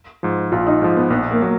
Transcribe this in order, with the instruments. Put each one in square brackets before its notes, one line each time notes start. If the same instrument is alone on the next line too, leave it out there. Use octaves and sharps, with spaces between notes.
[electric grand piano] G#2 F3
[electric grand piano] A#1 [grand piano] F4
[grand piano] D#4
[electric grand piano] G#2 F3
[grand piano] B3
[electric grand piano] A#1 [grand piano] B3
[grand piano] A#3
[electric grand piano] F#3 [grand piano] A#3